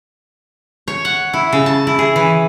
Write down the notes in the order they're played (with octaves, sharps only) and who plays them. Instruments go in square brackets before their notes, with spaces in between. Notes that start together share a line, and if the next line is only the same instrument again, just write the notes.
[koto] C#5
F#5
E4
C#3
A5
E4
G#4
E3